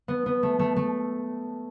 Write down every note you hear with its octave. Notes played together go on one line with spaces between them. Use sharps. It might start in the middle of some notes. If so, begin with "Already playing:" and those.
B3
B3
A3
A3
A3